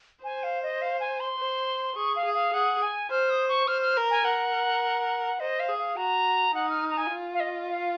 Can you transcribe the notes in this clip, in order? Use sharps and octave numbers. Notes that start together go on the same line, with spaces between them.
C5 G#5
F5
D#5
F5
G#5
C6
C5
G#4 C#6
F5
G#4
F5
G#4 F#5
G#5
C5 F6
D#6
C#6
C5 F6
F6
A#4
G#5
A#4 F#5
C5 D#5
F5
G#4
F5
F#4 A#5
D#4 F#5
F6
A#5
G#5
F4
F5
D#5
F5